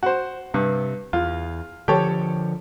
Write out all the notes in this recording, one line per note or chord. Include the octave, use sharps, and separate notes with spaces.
F#4 C5
G2 C3
E2 F4
D3 F3 G4 A4 C#5